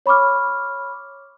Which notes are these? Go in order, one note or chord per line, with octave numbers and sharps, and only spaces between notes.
C#5 B5 C#6 D6 F6